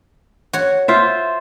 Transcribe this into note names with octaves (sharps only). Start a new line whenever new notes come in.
F#4 C#5
F4 C5 E5